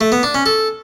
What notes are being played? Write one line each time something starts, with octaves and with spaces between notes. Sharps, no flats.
A3
B3
D4
C#4
A4